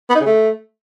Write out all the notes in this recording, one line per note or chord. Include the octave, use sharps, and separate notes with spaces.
B3
D#4
C#3
A3